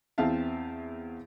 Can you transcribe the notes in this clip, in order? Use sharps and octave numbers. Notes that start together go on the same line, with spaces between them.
E2 C4 E5 F5 A5